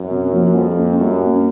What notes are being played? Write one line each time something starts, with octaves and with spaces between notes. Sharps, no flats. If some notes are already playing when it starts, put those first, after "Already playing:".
Already playing: F#2
C3
F3 A#3
F2 G3
A#3 C#4
F#2 G3
A#3 C#4